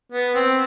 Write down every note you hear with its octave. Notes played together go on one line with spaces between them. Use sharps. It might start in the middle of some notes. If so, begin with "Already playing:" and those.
B3
C4